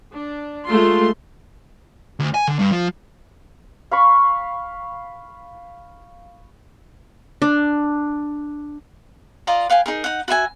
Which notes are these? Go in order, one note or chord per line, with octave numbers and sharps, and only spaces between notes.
D4
G#3 A3 F4 C6
D2
G#5
D3
G2
F3
F5 B5 C#6
D4
F4 D5 D#5 A#5
B4 F5 G5 G#5
D#4 G#4 A#4
D#4 F#5
F#4 B4 E5 G#5